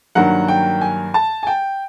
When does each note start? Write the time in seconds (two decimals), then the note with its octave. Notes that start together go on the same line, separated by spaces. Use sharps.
0.15 G2 D#3 F#3 A#3 F#5
0.48 G5
0.81 G#5
1.14 A5
1.43 G#5
1.47 G5